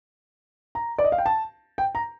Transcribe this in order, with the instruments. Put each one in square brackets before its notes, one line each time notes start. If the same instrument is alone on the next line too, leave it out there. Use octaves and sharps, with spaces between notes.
[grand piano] A#5
D5
D#5
F5
G5
A5
G5
A#5